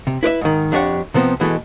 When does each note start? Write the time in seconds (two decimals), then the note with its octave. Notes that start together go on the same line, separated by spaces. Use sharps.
0.07 C3
0.23 E4 B4 D5 E5
0.41 G#2 D#3
0.72 F2 D4 G4 C#5 F#5
1.14 C3 F3 B3 C4
1.40 B2 E3 G#3 A3